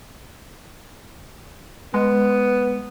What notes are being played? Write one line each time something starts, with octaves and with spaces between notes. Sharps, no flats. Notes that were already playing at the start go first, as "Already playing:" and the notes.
G#3 B3